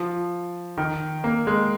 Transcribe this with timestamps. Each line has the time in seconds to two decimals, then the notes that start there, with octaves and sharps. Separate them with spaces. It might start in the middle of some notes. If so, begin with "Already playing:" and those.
Already playing: F3
0.78 D#3
1.24 A#3
1.47 G#3